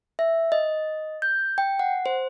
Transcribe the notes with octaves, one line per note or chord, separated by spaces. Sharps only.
E5
D#5
G6
G5
F#5
C5